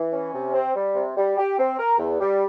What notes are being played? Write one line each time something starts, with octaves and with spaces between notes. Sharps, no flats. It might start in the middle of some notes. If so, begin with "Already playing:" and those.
Already playing: E3
C#4
C3
C4
G3
C3
G3
G4
C4
A#4
E2
G3